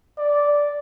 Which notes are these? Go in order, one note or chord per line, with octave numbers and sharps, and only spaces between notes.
D5